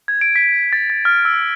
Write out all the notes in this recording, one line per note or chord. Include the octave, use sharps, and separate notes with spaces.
G#6
D7
B6
A6
A6
F6
E6